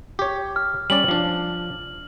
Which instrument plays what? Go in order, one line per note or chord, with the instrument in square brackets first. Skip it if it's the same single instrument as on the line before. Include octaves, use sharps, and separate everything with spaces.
[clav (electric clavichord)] G4 C#5
[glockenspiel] F6
[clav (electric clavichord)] G3 C#4 D5 [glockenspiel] F#7
[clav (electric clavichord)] F3 D4